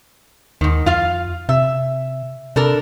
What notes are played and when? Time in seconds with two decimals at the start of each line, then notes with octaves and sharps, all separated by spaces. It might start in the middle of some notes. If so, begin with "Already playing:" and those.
0.61 D#2 G#2 D#3
0.86 F2 F4 F5
1.49 C3 E5
2.56 C3 D4 A4 A#4